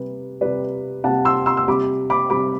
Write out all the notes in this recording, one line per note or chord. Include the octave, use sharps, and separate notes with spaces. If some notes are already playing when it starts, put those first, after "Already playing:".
Already playing: C3 G3 B4
C3 G3 B4 D5
C3 G3 F#5 A5
C6 E6
C6 E6
E6
C3 G3 B5 D6
B5 D6
C3 G3 B5 D6